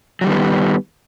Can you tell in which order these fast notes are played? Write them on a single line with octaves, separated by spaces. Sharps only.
F#3 G3 D#3 B3